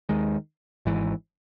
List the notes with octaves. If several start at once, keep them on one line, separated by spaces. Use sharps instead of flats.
D#2 D#3 G#3
G#1 G#2 E3